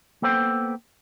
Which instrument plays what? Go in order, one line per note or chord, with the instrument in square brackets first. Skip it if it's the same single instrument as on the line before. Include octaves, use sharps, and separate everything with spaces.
[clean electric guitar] A#3 B3 A4 C5 G5